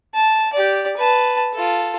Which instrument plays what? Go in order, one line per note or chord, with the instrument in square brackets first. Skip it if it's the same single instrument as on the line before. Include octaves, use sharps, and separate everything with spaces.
[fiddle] A5
G4 D5
B4 A5
F4 A4